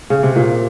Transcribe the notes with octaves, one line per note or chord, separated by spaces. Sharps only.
C#3
C3
A#2